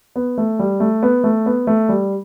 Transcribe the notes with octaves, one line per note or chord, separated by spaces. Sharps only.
B3
A3
G3
A3
B3
A3
B3
A3
G3